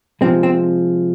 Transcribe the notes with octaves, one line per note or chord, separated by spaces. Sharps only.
C3 F3 G#3 C4
C4